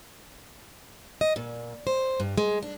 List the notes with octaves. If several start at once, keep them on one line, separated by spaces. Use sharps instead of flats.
D#5
A#2
C5
G2
G#3
D4